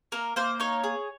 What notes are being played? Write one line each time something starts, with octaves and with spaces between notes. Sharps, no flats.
A#3 A#4
A#3 C5
D#4 C#5
G#4